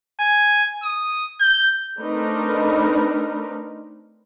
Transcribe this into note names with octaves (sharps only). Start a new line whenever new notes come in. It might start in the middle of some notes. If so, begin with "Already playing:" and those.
G#5
D#6
G6
A3 C4 D4 D#4 A#4 B4